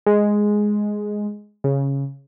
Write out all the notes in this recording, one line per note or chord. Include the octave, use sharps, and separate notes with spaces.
G#3
C#3